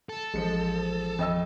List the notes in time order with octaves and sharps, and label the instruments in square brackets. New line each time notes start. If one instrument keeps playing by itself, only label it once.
[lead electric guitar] A4
[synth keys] A1 F3 [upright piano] G#3 C#7
[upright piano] F2 D#5 E6